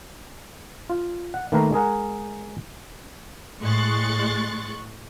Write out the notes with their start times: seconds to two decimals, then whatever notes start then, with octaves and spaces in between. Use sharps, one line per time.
0.90 F4
1.34 F#5
1.52 D#3 A3 A#3 B4 F5 A#5
1.73 G#3 G#4 A#4 F#5
3.60 A2 G#3 C6 C#6 F#6 A6